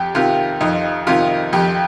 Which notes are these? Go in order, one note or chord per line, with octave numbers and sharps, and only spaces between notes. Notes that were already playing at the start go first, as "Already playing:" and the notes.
Already playing: F2 G4
C3 D#3 F4
F2 D#4
C3 D#3 F4
F2 G4